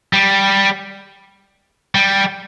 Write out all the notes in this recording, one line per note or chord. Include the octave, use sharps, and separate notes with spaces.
G3
G3